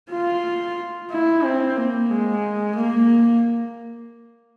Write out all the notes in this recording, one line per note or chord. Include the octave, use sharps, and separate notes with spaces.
F4
E4
C4
A#3
G#3
A#3